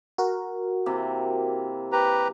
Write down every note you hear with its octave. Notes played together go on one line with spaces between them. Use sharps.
F#4 A#4
C3 E3 A#3
G4 B4 A#5